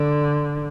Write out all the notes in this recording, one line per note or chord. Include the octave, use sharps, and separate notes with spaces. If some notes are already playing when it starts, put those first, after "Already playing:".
Already playing: D3